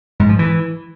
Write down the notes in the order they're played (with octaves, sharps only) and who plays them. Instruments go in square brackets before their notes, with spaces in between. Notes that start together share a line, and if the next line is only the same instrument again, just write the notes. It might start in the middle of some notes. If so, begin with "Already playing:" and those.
[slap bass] G#2
F3
E3